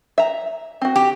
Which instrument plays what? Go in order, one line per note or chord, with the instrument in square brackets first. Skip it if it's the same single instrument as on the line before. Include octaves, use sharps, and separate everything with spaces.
[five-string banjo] E5 A#5
C4 F#4
[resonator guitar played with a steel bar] G4